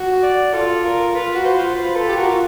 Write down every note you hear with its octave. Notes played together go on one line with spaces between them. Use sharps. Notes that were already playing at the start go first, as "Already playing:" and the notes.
Already playing: F#4
D5
F4 A4
A#4
F4 B4
F#4
C5
F4
B4
A4
G4
F#4 A#4
F4